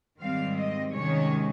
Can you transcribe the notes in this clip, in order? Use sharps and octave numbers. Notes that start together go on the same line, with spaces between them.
G#2 D#3 G3 C4 F5
D#5
C3 D#3 G#3 C#4 C#5